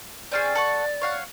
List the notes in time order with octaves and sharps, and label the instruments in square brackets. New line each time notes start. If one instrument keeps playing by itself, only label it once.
[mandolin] C4 C#4 G#4 [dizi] D5
[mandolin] A4 F#5 C#6
C#5 F5 F#5